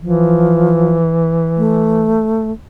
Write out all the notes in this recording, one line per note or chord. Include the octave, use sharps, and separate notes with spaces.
E3 F3
A3